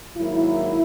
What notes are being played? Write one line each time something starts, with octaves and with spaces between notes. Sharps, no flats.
G#2 D#3 F#3 A#3 E4